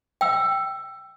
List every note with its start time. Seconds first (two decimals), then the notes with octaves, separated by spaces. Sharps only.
0.21 G5 E6